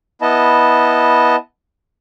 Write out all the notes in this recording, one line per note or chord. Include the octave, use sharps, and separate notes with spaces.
B3 E4 D#5 A5